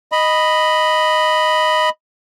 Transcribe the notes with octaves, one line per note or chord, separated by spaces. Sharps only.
D#5 B5